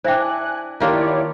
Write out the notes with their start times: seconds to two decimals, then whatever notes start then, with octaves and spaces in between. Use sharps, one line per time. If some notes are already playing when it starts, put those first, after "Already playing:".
0.04 D4 E4 C5 E5 G5 G#5 F#6
0.80 D#3 A#3 D4 E4 F4 G4 C#5 D5